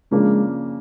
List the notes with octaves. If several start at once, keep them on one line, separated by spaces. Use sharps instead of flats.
C#3 F3 G#3 A#3 D4